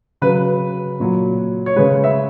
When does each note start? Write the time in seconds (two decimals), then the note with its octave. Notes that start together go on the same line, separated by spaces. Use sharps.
0.22 C#3 F#3 B4
1.00 A#2 F#3
1.66 C#5
1.76 C#3 G#3 B4
2.04 E5